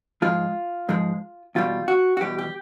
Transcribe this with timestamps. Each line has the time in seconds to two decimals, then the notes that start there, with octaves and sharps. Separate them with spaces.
0.22 G#2 F3 G#3 F4
0.89 G#2 F3 G#3
1.55 E2 B2 G3 F4
1.88 F#4
2.17 F#4
2.21 E2 B2 G3 G4
2.38 G4